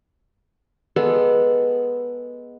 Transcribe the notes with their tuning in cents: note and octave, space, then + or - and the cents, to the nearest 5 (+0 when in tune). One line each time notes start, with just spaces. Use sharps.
G#3 +0 B3 -15 A4 +0